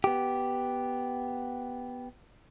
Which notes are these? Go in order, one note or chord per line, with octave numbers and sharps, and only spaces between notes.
B3 G4